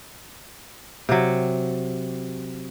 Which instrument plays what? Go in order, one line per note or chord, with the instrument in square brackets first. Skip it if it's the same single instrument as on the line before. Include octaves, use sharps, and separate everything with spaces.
[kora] C3 F#3